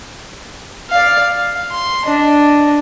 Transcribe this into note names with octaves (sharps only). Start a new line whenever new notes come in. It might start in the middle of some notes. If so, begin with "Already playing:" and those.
D5 F5
F5
C6
D4 D#5